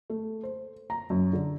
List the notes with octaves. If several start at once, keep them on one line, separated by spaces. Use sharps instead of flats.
A3
C5
A#5
F#2
D3